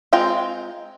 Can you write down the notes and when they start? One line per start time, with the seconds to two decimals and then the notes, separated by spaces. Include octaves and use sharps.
0.13 G#3 C4 F4 G5 A#5